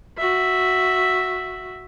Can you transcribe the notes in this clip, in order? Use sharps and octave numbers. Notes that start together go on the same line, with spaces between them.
F#4 E5